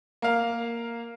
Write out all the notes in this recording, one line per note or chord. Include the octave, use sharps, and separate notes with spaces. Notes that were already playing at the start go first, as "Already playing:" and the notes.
A#3 F5